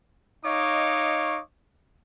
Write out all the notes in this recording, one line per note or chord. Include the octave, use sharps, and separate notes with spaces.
D#4 C#5 D#5 F5 C#6 D6